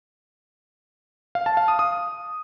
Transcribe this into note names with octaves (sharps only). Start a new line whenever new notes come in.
F5
A5
F5
D#6
D#6